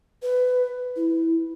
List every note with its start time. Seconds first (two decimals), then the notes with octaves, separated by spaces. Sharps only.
0.23 B4
0.96 E4